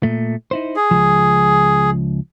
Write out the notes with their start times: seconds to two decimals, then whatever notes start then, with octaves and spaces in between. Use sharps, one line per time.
0.03 A#2 A3
0.51 D#4 E4 C5
0.76 G#4
0.91 C#2 F3